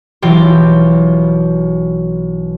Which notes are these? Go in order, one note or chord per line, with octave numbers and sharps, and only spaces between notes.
B1 E3 F4 G4